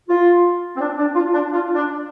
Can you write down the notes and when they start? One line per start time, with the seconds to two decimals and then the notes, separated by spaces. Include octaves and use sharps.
0.09 F4
0.77 C4
0.81 D4
0.98 D4
1.15 F4
1.33 D4
1.52 F4
1.75 D4